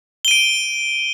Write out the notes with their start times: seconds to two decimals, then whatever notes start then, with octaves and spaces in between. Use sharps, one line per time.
0.25 G7
0.28 D#7
0.31 D7